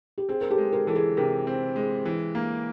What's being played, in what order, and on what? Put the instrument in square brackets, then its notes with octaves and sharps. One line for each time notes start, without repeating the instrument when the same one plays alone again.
[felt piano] G4
[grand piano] C4 [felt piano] G#4
[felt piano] A#4
G4 A4
[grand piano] G#3
[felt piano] G#4 A#4
[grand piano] E3 [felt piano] A4
[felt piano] G#4
[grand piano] C3 [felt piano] G#4 A#4
[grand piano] C4
G#3
E3
A#3